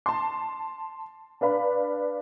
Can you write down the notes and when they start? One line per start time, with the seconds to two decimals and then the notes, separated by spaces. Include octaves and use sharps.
0.06 A5 C6
1.41 D4 B4 F5 B5